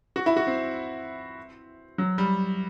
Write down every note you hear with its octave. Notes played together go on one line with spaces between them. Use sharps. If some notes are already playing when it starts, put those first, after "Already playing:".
F#4
E4
F#4
C4
F#3
G3